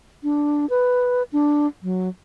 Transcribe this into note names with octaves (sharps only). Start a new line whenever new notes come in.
D4
B4
D4
F#3